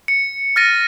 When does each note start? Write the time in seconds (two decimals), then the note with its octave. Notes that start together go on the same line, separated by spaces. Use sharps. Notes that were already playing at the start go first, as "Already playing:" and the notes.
0.08 C#7
0.56 F6 A6 A#6 D#7